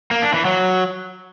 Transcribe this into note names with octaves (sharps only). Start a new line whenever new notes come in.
A#3
D4
E3
F#3